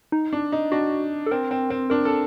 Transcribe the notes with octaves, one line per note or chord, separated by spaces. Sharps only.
D#4
D4
D#4
D4 F#4
A4
C4 A#4
C4
C4
D4 A#4
A4